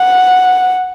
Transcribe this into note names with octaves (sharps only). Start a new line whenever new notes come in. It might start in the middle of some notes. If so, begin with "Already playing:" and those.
Already playing: F#5